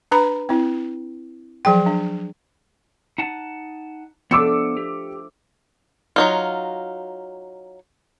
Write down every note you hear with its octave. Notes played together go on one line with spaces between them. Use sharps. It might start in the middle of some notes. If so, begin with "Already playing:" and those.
D4 B4 A#5 B5
C4 E4
F3 F#3 G#4 G5
D4
D#4 F#5 A5
F3 A3 B3 D4 D6 E6 C#7
G4
F#3 D#4 F4